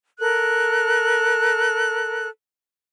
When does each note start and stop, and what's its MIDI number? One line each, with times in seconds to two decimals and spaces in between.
0.19 2.27 69
0.19 2.27 70
0.19 2.27 90